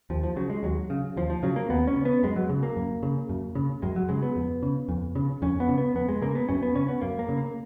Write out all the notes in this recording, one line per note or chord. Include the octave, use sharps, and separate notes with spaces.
D#2 F3
F3
C#3 F#3
G#3
D#2 F#3
C#3
D#2 F3
F3
C#3 F#3
A#3
D#2 B3
C#4
C#3
B3
F#2 G#3
F#3
C#3
A#3
F#2
C#3
F#2
C#3
F#2 G#3
F#3
C#3 G#3
B3
F2
C#3
F2
C#3
F2 C#4
B3
C#3
B3
F2 B3
G#3
C#3 A#3
B3
F#2 C#4
B3
C#3 C#4
B3
F#2 A#3
A#3
C#3
A#3